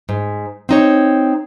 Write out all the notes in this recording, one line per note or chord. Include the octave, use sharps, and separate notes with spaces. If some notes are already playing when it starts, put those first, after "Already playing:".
G#2
C4 D#4 C#5